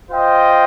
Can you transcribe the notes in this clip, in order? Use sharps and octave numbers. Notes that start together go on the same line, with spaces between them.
F4 C5 D#5 G5